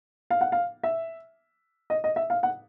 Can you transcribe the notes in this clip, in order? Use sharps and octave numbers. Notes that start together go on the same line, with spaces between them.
F5
F#5
F5
E5
D#5
D#5
E5
F5
F#5